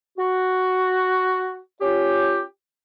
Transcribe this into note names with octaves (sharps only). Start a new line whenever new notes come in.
F#4
C#4 F4 G4